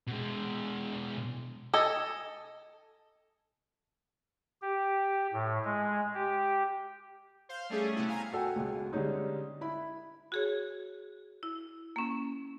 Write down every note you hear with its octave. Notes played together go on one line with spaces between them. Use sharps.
B2 G#3
A4 D#5 G#5
G4
A2
G#3
G4
C5 F5
G3 A3 C#4 G#4
C3 A3 B3 E4
F5 G#5 A#5
F#4 A4 G5 G#5
C#2 B2
D3 G3 G#3 C#4 D#4
E4 B5
F#4 G#4 C#5
E4
A#3 C#4